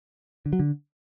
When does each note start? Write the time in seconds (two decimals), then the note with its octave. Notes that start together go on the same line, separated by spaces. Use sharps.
0.46 D3
0.53 F#3
0.60 D3